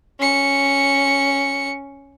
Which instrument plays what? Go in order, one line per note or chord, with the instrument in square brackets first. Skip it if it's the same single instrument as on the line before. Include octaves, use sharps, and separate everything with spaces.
[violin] C#4 C#7